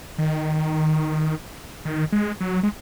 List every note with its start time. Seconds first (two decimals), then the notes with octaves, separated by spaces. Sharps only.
0.18 D#3
1.85 D#3
2.12 G#3
2.41 F#3
2.63 G#3